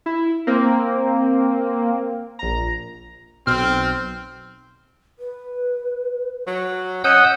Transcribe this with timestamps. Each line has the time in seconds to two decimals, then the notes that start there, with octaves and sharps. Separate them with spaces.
0.06 E4
0.47 A#3 C4
2.39 A#1 A#5
3.47 B1 C4 F6
5.19 B4
6.47 F#3
7.04 C#4 D#5 F#5 D#6 E6 G6